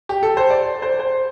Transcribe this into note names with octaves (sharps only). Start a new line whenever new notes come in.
G4
A4
C5
D5
C5
C5